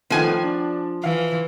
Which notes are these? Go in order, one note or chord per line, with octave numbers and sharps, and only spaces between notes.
D#3 F3 A3 B3 G#5
D4
E3 F5